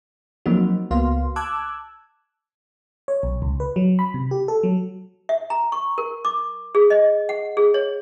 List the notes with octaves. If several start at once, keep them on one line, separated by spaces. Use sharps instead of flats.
F3 F#3 A#3 C4 D#4 F#4
C#2 A#3 B3 F#4 F5 C6
A5 D6 E6 F#6 G#6
C#5
B1
C#2
B4
F#3
B5
C3
G4
A4
F#3
E5
A#5
C#6
A#4
D6
G#4
D#5
F#5
G#4
C#5